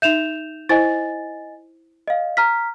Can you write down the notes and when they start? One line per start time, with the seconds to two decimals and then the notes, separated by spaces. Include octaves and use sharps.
0.02 D#4 E5 G6 E7 F7
0.69 E4 C5 D#5 G#5 A6
2.07 D#5 F5
2.37 A#5 F6 B6